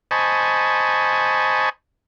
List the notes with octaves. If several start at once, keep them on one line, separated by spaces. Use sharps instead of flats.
C5 D#5 G#5 A5 B5 C#6